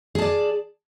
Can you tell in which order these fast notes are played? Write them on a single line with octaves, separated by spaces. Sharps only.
G#4 A5 D5